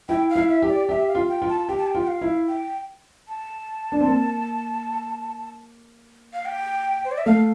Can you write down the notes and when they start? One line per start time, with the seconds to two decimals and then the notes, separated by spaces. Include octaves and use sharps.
0.09 E4 G5
0.30 F5
0.36 E4
0.49 E5
0.62 G4
0.69 D5
0.89 G4 E5
1.08 F5
1.15 F4
1.29 G5
1.42 F4
1.49 A5
1.68 G4 G5
1.77 A5
1.87 G5
1.95 F4
2.02 G5
2.08 F5
2.21 E4
2.48 G5
3.28 A5
3.92 D4
4.00 C4
4.08 A#3
6.33 F5
6.45 G5
7.05 C5
7.12 D5
7.18 E5
7.26 A3 F5